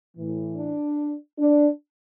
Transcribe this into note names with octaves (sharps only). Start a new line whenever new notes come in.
A2 E3
D4
D4